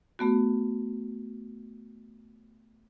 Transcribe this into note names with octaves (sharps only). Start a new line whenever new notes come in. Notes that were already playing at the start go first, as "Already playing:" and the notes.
A3 B3 F#4